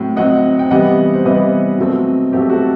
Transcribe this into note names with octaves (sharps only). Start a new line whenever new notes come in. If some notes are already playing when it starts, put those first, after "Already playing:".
Already playing: A2 F#3 C4
A2 F#3 C4 D#5 F#5
G5
C3 E3 G3 B3 D#5 F#5
C5
C3 E3 G3 B3 B4 D#5
B2 F#3 A3 C4
B2 F#3 A3 C4 G4
F#4 A4